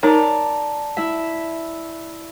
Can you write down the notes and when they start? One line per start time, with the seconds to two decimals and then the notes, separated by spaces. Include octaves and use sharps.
0.03 D#4 A#4 C#5 D5 A5 A#5
0.97 E4 E5